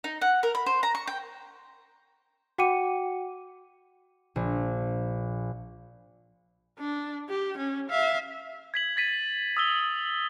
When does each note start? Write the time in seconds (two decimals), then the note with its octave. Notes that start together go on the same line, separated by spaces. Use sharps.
0.04 D#4
0.21 F#5
0.43 A#4
0.55 B5
0.66 C5
0.83 A#5
0.95 C#6
1.07 G5
2.58 F#4 F#5 G5 D6 C#7 D#7
4.36 A#1
6.79 D4
7.29 G4
7.58 C#4
7.90 E5 F5
8.74 G#6 B6 F#7
8.96 G#6 A6 B6 D#7
9.57 D#6 E6 G7